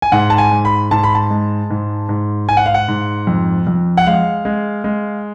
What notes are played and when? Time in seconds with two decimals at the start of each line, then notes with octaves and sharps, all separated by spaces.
0.02 G#5
0.12 G#2 F#5
0.30 A5
0.38 G#5
0.51 G#2
0.65 B5
0.91 G#2 A5
1.03 B5
1.15 A5
1.30 G#3
1.70 G#2
2.09 G#2
2.48 G#2 G#5
2.57 F#5
2.66 F5
2.74 F#5
2.88 G#2
3.27 F2
3.67 F2
3.97 F#5
4.06 G#3 F5
4.45 G#3
4.84 G#3